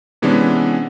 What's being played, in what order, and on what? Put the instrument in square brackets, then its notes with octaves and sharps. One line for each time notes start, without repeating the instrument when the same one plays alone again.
[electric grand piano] C3 E3 G#3 B3 C#4 D4